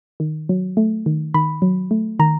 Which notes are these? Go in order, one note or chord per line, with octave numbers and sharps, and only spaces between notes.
D#3
F#3
A3
D#3
D#3 B5
F#3
A3
D#3 A#5